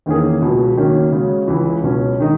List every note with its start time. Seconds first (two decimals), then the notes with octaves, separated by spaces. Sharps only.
0.06 E2 D#3 A#3 C#4 G#4
0.42 C#2 B2 F#3
0.77 D#3 F#3 A#3 C#4
1.12 C#3 G#3 C#4 F#4
1.48 C#2 C#3 E3
1.83 C#2 B2 F#3 C#4
2.20 D#3 G#3 D#4